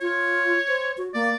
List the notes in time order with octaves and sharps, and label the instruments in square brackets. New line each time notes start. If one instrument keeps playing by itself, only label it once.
[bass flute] F4 [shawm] C#5
[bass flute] C5
F#4
[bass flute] A#3 [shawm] D5